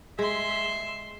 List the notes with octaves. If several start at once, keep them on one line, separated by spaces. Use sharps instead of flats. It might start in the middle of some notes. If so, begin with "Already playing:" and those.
G#3 E5 C6